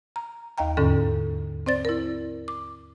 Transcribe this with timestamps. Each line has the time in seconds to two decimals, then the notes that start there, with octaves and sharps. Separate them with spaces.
0.16 A#5
0.58 D#2 D#5 F5 G5 A#5
0.77 E2 G#2 D3 C#4 A4
1.66 C4 C5 D5 A6
1.85 E4 A#4
2.48 D6